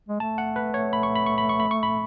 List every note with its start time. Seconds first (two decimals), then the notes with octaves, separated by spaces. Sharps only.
0.09 G#3
0.20 A3 A5
0.38 F#5
0.56 B4
0.74 C#5
0.93 B5
1.03 C#6
1.16 B5
1.26 C#6
1.38 B5
1.49 C#6
1.60 B5
1.71 C#6
1.83 B5